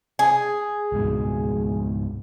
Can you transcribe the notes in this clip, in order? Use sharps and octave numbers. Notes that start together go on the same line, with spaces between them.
G#4
C#2 G#2 B2